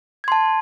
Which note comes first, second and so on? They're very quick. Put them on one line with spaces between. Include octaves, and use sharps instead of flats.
G#6 C6 A5